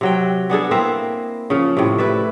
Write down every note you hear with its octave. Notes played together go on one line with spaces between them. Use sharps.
C3 F#3 G5
B3 D4 G#4 A4
A#3 C4 E4 E5
C#3 F3
A2 C3
E4 B4 D5 E5